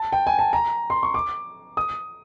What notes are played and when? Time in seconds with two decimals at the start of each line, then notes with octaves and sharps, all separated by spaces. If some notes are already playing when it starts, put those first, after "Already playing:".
Already playing: A5
0.12 G5
0.27 G#5
0.39 A5
0.53 A#5
0.90 C6
1.03 C#6
1.14 D6
1.77 D#6